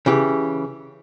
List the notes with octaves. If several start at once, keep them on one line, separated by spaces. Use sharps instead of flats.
C#3 E3 G4